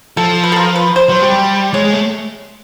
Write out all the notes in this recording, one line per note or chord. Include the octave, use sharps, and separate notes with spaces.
F3 A4
B4
A4
A#4
B4
C5
F#3
G3
G#3 C#5
G#3
A3